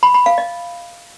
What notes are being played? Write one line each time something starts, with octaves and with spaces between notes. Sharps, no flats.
B5
B5
F5
D#5